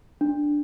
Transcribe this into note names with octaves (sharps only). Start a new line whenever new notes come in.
D4